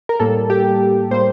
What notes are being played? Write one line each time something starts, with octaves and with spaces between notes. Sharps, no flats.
A#4
A2 G3 A#3 A4
G4
A2 G3 A#3 C5